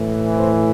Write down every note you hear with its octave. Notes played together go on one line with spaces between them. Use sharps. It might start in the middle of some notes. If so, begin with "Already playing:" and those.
Already playing: A2 E3
C4